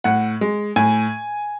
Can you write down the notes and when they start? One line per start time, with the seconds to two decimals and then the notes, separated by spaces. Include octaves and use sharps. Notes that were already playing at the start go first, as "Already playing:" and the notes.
0.04 A2 F#5
0.41 G#3
0.76 A2 G#5